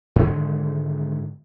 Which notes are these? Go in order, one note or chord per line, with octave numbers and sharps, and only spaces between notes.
G#2 D3 D#3 G#3